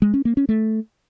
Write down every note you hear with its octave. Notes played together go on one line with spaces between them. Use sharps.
G#3
C#4
A#3
C#4
A3